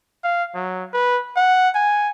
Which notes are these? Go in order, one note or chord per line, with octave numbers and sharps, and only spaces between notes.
F5
F#3
B4
F#5
G#5